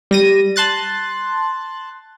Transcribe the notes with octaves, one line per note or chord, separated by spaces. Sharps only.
G3 A#6 D#7
A5 C6 F#6 A6